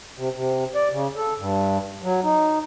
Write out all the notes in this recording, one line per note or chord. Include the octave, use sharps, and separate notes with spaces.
C3
C3
D5
C#3
A4
G2
F#3
D#4